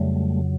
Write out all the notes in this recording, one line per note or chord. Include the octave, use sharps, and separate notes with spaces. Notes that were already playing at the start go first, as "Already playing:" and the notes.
Already playing: F2 C#3 F#3 G3 A3